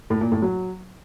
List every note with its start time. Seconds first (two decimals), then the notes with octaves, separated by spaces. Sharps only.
0.10 A2
0.21 A#2
0.32 A2
0.42 F#3